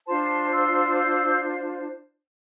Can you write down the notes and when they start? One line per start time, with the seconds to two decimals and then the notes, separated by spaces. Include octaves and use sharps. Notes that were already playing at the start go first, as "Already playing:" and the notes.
0.07 D4 F4 C5 A5 C6
0.52 C6 E6
0.97 E6 G6